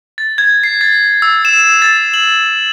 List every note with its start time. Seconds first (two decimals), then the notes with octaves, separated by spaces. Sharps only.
0.18 A6
0.38 G#6
0.63 C7
0.81 A6
1.22 E6
1.45 E7
1.82 A6
2.14 F#7